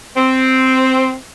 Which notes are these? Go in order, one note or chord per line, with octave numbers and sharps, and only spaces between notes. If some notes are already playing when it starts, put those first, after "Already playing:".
C4